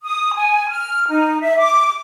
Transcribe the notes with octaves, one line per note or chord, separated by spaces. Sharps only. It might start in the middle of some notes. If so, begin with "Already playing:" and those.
D#6
G#5
F6
D#4
E5
D6